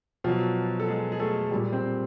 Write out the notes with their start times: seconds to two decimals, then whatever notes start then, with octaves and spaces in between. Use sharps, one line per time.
0.24 B2 F3 F#3 F4
0.80 A4
0.88 G#3 G#4
1.12 G#4
1.20 A3 A4
1.51 A#2 G3
1.73 C4 C5